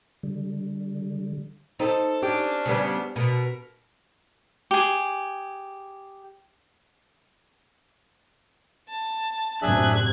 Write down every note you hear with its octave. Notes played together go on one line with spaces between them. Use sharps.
D3 G3
C4 D#4 A4
C#4 D4 G4 G#4 G5
C#3 G3 B3
B2 A#4
G4 G#4
A5
F#2 A2 C3 D4 G#4 E5 F#6 G#6